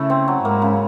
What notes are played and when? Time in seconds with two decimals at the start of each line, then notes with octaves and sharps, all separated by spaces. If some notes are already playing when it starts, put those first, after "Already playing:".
Already playing: C#3 A3 E4
0.10 C4
0.28 F#3
0.44 G#2 A#3
0.62 C#3